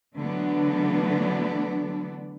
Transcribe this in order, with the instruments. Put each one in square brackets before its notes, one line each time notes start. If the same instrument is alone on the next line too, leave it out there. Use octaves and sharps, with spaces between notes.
[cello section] D3 E3 F#3 A3 B3 D4